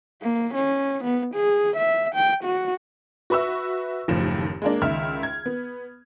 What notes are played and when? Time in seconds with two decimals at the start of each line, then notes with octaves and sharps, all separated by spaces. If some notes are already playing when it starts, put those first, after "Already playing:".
0.22 A#3
0.55 C#4
1.04 B3
1.35 G#4
1.77 E5
2.15 G5
2.44 F#4
3.30 F#4 B4 E5 C#6 E6
4.08 F#1 D#2 A2 F3 E7
4.62 G#3 A#3 D4
4.82 C#2 D#3 E5 F6
5.23 G#6
5.46 B3